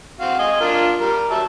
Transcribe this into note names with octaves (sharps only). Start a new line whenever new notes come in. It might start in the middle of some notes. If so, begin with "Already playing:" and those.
C4 F#4 F5
D#5 G#5
D4 F4 A#4
G3 A#4
F#3 E5 A5